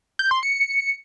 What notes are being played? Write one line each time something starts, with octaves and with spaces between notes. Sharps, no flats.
G6
C6
C#7